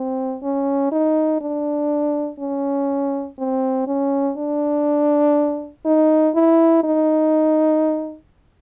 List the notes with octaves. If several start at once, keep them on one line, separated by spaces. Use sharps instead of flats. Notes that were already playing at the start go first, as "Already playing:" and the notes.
Already playing: C4
C#4
D#4
D4
C#4
C4
C#4
D4
D#4
E4
D#4